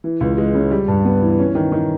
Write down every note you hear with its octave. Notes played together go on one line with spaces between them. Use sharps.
E3
C#2
G#3
C#3
G3
G2
B3
E3
C#4
D#3
D#3